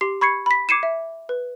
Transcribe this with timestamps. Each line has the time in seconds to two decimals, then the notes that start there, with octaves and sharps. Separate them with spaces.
0.01 G4 C6 C7
0.21 B5 C#6 G#6 C7 C#7
0.46 B5 B6
0.69 D6 G#6 C7 C#7 D#7 E7
0.83 E5
1.29 B4